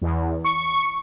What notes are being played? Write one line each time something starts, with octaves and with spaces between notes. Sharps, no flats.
E2
C#6